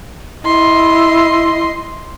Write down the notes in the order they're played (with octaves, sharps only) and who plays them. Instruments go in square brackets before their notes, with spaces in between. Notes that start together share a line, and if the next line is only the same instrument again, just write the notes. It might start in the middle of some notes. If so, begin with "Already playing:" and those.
[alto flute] E4 [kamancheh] D#5 C6